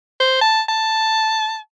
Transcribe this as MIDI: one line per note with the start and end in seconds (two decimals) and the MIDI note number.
0.20 0.37 72
0.41 0.61 81
0.69 1.57 81